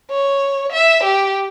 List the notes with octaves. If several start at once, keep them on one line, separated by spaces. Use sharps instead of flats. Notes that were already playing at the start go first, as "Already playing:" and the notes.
C#5
E5
G4